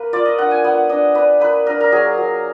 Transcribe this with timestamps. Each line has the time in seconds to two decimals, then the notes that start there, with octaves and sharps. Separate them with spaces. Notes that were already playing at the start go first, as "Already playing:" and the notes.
Already playing: A#3 B4
0.13 F4 D5
0.25 D#5
0.38 D4 F#5
0.51 G#5
0.64 B3 F#5
0.89 D4 D#5
1.15 D4 B4
1.40 A#3 B4
1.66 D4 A#4
1.80 A#4
1.92 F#3 G#4
2.18 F#3